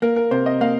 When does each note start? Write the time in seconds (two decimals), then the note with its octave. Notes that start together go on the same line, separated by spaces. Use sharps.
0.02 A#3 A#4
0.16 A#4
0.31 C3 C5
0.46 D#5
0.61 A#3 F5